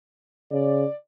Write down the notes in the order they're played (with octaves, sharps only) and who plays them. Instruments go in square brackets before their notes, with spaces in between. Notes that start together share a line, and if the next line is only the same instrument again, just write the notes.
[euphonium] C#3 [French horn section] D5